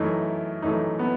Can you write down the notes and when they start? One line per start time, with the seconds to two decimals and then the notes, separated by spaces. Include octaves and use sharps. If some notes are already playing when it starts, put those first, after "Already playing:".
Already playing: F#2 E3 A3 D#4
0.62 F#2 E3 A3 D#4
0.99 B3